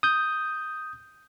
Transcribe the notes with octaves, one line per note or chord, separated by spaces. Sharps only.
D#6 G6